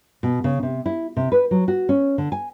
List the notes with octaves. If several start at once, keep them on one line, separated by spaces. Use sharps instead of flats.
B2
C#3
C3
E4
C3
B4
F#3
F#4
C#4
D3
G#5